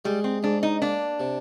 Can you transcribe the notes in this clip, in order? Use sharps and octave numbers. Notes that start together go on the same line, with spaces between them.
G3 G#3
C4
G#2 D4
D#4
A#3 D4
C3